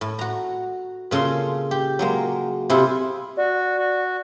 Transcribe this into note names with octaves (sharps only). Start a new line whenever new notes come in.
A2
F#4 A#5
A#2 C#3 A4 C6
G4
F#3 G#3 A#3
C3 E4 F4 G#4 A4
F#4 D5
F#4